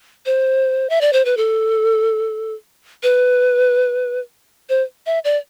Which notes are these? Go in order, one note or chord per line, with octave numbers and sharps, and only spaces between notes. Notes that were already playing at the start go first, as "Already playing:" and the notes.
C5
E5
D5
C5
B4
A4
B4
C5
E5
D5